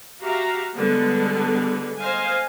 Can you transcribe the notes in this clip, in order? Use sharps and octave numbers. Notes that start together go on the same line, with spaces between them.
F#4 G4 E5 F5 A#5
D3 G3 G#3 B3
C5 D#5 F5 G#5